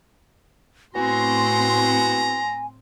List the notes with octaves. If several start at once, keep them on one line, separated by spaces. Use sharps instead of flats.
A2 B3 C4 E4 F#4 G#5 A#5 C6